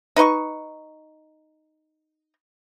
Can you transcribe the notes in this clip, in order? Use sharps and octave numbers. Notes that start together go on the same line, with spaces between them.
D#4 B4 D#5 C#6